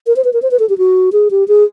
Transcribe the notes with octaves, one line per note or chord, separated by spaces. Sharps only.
A#4
C5
B4
A#4
C5
B4
A4
G4
F#4
G#4
G4
G#4